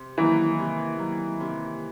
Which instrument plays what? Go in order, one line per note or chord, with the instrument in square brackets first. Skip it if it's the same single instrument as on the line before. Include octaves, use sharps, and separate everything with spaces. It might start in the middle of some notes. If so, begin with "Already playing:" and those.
Already playing: [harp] C3
[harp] D#3 F#3 A#3 [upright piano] E3
[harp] C3
D#3 F#3 A#3
C3